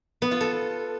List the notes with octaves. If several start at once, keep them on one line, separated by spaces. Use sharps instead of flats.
B3
F4
A4